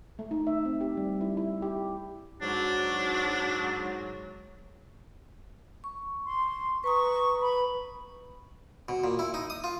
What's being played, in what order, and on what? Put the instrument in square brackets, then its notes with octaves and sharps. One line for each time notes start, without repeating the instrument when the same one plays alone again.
[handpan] A3
D#4
E5
C4
G4
G3
E4
E4
G4
[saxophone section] G#2 F#3 [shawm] D4
[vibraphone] C#6
[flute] C6
[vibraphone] B4 A#5 D#6 [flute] C#6
[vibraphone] B4 [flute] B5
[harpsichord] B2
A#2
E4
D#4
D#6
F4